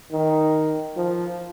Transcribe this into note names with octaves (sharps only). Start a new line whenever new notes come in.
D#3
F3